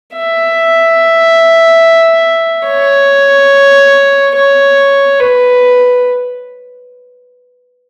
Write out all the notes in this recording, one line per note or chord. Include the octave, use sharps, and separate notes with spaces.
E5
C#5
C#5
B4